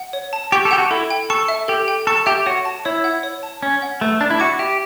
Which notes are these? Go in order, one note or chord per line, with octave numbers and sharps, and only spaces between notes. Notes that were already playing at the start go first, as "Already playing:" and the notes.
Already playing: F#5
C#5
A5
G4 C#6
A4
G4 F#5
F#4
E4 A4
G5
A4 C#6
E5
G4 A4
G5
A4 C#6
G4 E5
F#4 C#5
A5
E4 C#5
F#5
C#5
A5
C#4 C#5
F#5
A3 B4
D4 A5
E4
F#4 D6
G4 E5